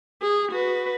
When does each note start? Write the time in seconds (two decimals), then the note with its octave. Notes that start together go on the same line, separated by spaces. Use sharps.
0.22 G#4
0.51 F#4 B4